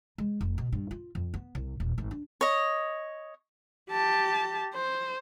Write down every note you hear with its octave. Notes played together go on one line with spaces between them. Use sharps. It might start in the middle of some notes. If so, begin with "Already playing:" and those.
G#3
F1
B2
G2
F4
F2
B3
C2
D#1
G#1
D4
C#5 D#5
G4 A5
C5